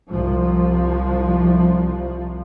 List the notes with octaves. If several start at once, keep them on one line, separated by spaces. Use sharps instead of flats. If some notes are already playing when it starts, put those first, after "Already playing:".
C2 F3